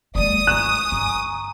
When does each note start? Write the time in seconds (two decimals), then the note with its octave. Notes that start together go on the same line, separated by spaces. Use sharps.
0.15 G#3 A#3 D5 D#6
0.47 A3 F4 G#5 A#5 C#6 F#6 E7
0.92 G1